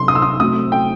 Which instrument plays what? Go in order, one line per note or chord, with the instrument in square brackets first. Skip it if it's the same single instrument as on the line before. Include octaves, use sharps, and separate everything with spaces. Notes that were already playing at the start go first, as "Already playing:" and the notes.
Already playing: [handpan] C3 F#3 B3 D#4 [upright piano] C6
[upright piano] D#6
E6
D#6
[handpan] A3 C4 F#4 [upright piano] D#6
[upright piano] G5